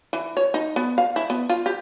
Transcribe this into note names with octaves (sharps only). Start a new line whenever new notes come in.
E3
C#5
D#4
B3
F5
E4
B3
F4
G4